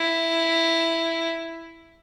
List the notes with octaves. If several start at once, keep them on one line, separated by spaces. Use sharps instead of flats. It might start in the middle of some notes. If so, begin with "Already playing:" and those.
Already playing: E4